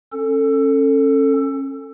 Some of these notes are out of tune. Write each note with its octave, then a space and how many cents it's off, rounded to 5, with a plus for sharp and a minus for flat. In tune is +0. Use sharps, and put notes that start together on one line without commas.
C#4 -30 A4 +15